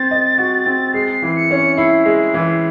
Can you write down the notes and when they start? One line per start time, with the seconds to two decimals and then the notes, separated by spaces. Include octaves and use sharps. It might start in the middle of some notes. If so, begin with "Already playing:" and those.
Already playing: C4 C5 A6
0.11 D#5
0.38 F#4
0.66 C4
0.94 G#3 C7
1.22 E3
1.36 C#7
1.51 C#4
1.77 E4 C7
2.05 G#3
2.19 C7
2.34 E3